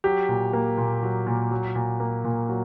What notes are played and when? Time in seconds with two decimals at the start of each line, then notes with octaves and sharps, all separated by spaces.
0.04 F#3 G4
0.29 A#2
0.53 A#3
0.78 A#2
1.03 F#3
1.27 A#2
1.51 F#3
1.75 A#2
2.00 A#3
2.24 A#2
2.49 F#3